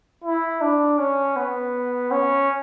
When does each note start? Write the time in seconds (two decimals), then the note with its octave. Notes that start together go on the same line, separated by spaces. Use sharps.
0.24 E4
0.61 D4
0.99 C#4
1.36 B3
2.11 C#4